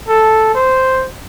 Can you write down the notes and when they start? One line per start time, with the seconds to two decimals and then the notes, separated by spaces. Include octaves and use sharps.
0.08 A4
0.55 C5